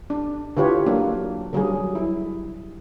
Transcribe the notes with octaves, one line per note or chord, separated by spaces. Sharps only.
D4
D3 E4 F4 G4 B4 C#5
F#3 A#3 D4
D3 F#3 G3 G#4
E4